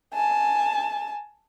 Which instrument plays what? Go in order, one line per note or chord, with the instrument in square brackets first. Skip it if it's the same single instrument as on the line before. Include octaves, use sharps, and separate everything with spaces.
[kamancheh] G#5 A5